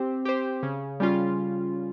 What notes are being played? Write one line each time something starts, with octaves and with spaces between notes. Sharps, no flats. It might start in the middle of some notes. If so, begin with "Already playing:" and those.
Already playing: C4 G4 C5
G4 C5
C#3
G3 C#4 F4